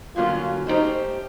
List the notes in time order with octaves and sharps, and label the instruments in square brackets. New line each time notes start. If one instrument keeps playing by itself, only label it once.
[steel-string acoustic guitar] G2 D3 F#3 A#3 C#4 [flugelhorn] F4
[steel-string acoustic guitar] A3 C#4 E4 G4 C5 [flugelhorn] D#4